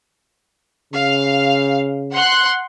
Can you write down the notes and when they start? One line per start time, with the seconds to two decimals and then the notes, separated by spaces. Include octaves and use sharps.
0.93 C#3 F5
2.13 F#5 C6 F#6